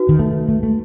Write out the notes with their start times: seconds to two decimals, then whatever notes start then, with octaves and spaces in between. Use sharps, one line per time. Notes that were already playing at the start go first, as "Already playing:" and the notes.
Already playing: D#4 F#4 B4
0.09 D#3
0.19 A3
0.49 A3
0.63 A3